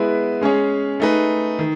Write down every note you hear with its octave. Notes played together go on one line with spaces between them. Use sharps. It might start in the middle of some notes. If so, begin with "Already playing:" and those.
Already playing: G#3 B3 E4 B4
G#3 C#4 G#4 C#5
A3 D#4 G#4 B4
D#3